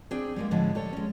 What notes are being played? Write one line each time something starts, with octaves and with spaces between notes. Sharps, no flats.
C4 D4 G#4 G5
G3 G#3 A#3
A2 D3 F3 G#3
G3 A4 C#5
G#3 C#4